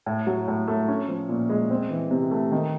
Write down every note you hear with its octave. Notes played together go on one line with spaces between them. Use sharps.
A2
F#3
A2
A3
C#4
F3
A#2
G#3
C4
E3
C3
A3
D#3